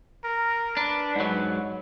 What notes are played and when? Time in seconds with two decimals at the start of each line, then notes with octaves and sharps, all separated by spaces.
0.24 A#4
0.77 D4 B4
1.16 G#2 F#3